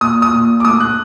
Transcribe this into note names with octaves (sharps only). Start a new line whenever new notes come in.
A#2 D#6
D#6
A#2
D6
A3 D#6
F#6